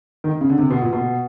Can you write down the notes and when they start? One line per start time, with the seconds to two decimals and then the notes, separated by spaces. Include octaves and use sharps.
0.24 D#3
0.41 C#3
0.49 D3
0.59 C3
0.70 B2
0.82 A#2
0.93 B2